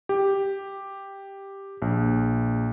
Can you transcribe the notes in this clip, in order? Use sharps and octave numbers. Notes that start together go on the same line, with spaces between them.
G4
A#1